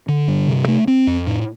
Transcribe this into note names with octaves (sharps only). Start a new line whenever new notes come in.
D3
G2
C3
A3
C4
F2
A2